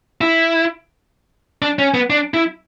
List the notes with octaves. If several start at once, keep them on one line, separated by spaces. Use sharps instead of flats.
E4
D4
C#4
B3
D4
E4